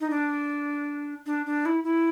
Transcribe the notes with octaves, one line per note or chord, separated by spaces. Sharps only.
D#4
D4
D4
D4
E4
E4